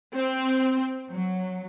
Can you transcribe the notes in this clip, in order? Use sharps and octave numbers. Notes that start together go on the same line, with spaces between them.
C4
F#3